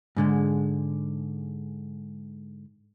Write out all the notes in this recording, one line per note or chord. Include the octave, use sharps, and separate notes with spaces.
G#2 D3 G#3